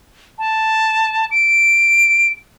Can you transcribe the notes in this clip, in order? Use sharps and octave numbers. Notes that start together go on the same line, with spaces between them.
A5
D7